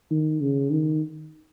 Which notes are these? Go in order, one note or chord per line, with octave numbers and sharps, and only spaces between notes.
D#3
C#3
D#3